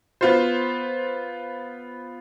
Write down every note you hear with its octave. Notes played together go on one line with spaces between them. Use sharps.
B3 F4 C5